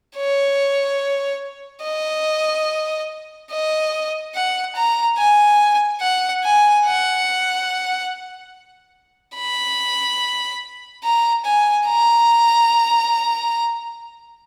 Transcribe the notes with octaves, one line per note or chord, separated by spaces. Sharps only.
C#5
D#5
D#5
F#5
A#5
G#5
F#5
G#5
F#5
B5
A#5
G#5
A#5